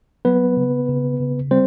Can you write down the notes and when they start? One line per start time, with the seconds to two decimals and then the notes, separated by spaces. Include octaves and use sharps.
0.25 F#3 B3 B4
0.57 C#3
0.89 C#3
1.20 C#3
1.51 G3 C4 C5